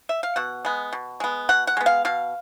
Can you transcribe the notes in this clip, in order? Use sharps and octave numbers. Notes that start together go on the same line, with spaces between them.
E5
F5
B2 F#5
G#3 B3
B2
G#3 B3
B2 F#5
F#5
G#3 B3
F5
B2 F5